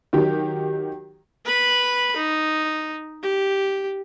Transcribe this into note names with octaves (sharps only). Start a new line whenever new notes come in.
D#3 F#3 G4
B4 B5
D#4
G4